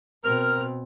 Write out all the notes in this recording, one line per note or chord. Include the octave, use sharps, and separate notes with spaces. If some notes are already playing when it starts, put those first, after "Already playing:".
B2 C4 A#4 F6